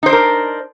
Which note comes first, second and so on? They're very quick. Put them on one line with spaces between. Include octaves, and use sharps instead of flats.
D#4 C5 D4 A#4